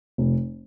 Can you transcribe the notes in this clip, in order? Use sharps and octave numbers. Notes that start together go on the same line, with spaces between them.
F1